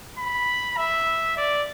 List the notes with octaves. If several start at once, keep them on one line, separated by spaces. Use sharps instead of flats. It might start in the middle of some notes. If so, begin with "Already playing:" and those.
B5
E5
D5